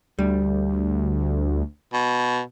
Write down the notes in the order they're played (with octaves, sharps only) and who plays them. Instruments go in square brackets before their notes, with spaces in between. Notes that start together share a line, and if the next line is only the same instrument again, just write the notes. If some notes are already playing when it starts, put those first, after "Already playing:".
[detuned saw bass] D2 [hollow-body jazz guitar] G3
[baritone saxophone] B2